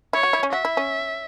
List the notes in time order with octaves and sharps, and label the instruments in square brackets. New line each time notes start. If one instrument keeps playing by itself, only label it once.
[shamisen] E4 [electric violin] C#5
[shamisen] F#4
E4
C#4
[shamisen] F#4 [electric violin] E5
[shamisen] E4
C#4